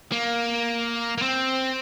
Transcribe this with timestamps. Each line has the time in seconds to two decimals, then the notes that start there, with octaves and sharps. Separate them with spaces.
0.12 A#3
1.18 A#3
1.22 C4